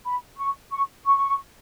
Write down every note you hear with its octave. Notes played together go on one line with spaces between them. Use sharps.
B5
C#6
C#6
C#6